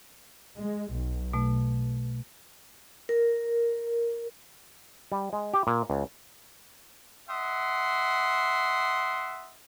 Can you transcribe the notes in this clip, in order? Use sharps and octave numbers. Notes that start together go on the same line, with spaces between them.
G#3
B1
B2 A3
A#4
G3
G#3
G4
A#2
C#2
D#5 E5 F#5 C6